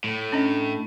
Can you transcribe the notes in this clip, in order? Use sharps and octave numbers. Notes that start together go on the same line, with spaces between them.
A2
C#4 D4 D#5